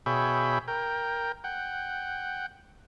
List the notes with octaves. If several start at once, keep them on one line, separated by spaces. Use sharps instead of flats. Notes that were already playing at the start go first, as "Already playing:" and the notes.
B2 G#4 C#5 E5 G5 B5
A#4 G5
F#5 G5